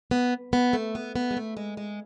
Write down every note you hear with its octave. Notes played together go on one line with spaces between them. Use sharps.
B3
B3
A3
B3
B3
G#3
A3
G#3
G#3